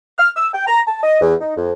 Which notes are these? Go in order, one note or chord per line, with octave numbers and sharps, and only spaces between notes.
F6
E6
G5
A#5
A5
D#5
E2
D#4
F2